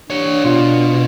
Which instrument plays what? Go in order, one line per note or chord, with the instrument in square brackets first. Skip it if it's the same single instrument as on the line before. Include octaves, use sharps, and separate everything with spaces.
[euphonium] D4 [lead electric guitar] G4 C#5
[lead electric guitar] B2 [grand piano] F4